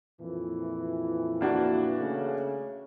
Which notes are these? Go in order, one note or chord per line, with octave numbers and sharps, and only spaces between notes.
F2 A#2 E3
A#3 D4 F#4
C#3 A3 C#4